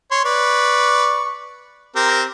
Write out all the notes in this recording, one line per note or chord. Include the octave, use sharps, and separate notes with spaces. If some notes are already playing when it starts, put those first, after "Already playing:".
C#5 C6
B4 D5 C#6
C4 G4 A#4